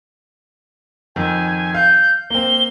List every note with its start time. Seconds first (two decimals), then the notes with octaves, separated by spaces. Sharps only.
1.16 F2 D#3 G#5
1.75 F5 G6
2.30 A#3 C4 G7